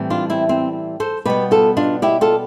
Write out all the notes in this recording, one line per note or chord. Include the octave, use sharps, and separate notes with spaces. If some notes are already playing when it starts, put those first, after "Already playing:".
Already playing: A2 E3 G3 C4
D4 F4
C4 E4
C4
A4 C5
B2 G3 B3 G4 B4
F4 A4
D4 F4
E4 G4
F4 A4